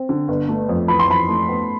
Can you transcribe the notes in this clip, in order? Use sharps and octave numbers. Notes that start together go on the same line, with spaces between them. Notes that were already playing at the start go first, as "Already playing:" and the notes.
Already playing: C4
D3
G1
A3
F2
E3 B5
C6
F2 B5
A3
B3